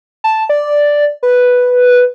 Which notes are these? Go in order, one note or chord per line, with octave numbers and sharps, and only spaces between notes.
A5
D5
B4